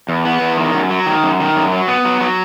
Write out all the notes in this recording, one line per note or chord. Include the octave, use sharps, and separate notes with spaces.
E2
B3
E2
D#3
F#2
F#3
D#3
F#2
D#3
F#2
F#3
B3
F#3
F#3